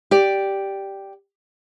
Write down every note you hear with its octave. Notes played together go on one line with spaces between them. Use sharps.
G4 D5